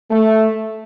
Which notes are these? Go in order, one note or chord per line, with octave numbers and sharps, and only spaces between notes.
A3